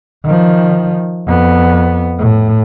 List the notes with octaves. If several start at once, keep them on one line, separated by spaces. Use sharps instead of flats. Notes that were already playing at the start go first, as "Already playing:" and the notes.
D#3 F3
F2 B3
A2